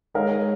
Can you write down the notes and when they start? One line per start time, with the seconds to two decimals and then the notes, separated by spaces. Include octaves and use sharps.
0.14 G#3 D#4 A#4 C#5 F5